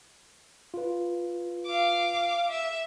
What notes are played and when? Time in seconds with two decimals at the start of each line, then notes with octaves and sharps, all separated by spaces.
0.74 F4 B4
1.66 F5 D6
2.50 E5